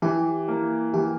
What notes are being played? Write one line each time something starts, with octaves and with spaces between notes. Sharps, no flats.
E3 E4 G4
A#3
E3 E4 G4